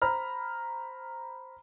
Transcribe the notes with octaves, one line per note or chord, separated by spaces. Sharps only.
C5 A#5 B5 F6